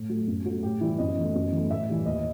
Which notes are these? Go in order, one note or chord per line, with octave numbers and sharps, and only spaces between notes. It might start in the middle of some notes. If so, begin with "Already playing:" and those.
Already playing: A2
F#3 A3
F#2
F#3 A3
A2 G4
E3 G3 E4
F#2 D#5
E3 A3
F#2
E3 A3
A2 E5
E3 G3
D#2 D#5